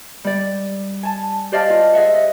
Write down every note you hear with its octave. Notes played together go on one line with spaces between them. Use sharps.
G3 D5
G#5 A5
G4 C5 D5 D#5 F5 A5
F4
G#4 D#5 E5 F#5
D#5